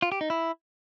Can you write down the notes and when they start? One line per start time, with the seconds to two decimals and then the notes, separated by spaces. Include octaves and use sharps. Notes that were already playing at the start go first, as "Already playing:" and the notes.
0.02 F4
0.12 G4
0.21 D#4
0.30 E4